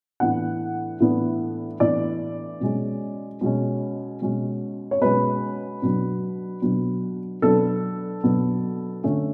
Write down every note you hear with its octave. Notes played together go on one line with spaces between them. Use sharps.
A2 E3 B3 D4 F#5
A2 E3 B3 D4
A2 E3 B3 D4 D5
B2 G#3 C#4
B2 G#3 C#4
B2 G#3 C#4
C#5
B2 G#3 C#4 B4
B2 F#3 B3 D4
B2 F#3 B3 D4
B2 F#3 B3 D4 A4
B2 F#3 B3 D4
D3 A3 C#4